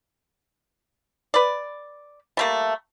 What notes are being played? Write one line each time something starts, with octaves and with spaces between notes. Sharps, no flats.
B4 D5
G3 A3 A#3